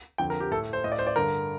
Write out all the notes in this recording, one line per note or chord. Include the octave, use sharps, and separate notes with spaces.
F2 D3 G5
A#4
G4
A2 A4
C5
A2 D#5
D5
C5
D5
G2 D3 A#4